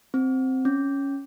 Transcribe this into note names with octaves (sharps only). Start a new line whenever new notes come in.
C4
C#4